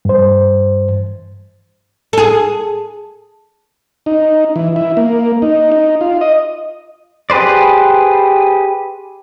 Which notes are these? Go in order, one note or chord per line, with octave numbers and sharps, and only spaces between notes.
G2 C5
G#4 A4
D#4
E3
E4
A#3
D#4
D#4
F4
D#5
G4 G#4 B4 C5 D5